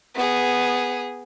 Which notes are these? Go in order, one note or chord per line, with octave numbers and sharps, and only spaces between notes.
B3 G#4